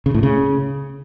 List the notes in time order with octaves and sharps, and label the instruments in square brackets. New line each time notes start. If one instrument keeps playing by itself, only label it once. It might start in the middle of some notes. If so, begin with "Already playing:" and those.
[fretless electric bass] C#3
A2
C#3